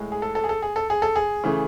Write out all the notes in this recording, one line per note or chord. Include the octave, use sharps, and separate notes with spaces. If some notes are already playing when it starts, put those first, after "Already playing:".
Already playing: A2 G#3
G#4
A4
A4
G#4
A4
G#4
A4
G#4
A4
G#4
C#3 E3 A3